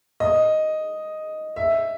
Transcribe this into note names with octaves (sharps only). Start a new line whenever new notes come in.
D#5
E5